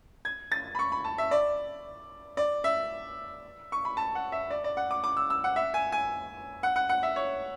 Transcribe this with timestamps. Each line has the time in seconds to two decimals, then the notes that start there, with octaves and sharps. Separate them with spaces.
0.25 G#6
0.52 A6
0.75 B5
0.79 C#6
0.92 B5
1.04 A5
1.18 E5
1.31 D5
2.37 D5
2.64 E5
3.72 C#6
3.85 B5
3.97 A5
4.15 F#5
4.32 E5
4.50 D5
4.64 D5
4.77 F#5
4.91 D6
5.04 D6
5.17 E6
5.30 E6
5.44 F#5
5.56 E5
5.74 G#5
5.92 G#5
6.63 F#5
6.76 F#5
6.89 F#5
7.03 E5
7.16 C#5